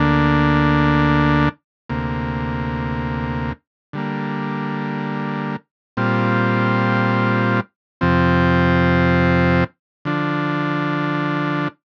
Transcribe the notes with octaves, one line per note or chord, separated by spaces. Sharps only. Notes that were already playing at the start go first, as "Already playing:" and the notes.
Already playing: D2 D3 A#3 D4
D2 C3 A#3
D3 G3 A#3
A#2 G3 C4 F4
F2 C3 F3 C4
D3 F3 D4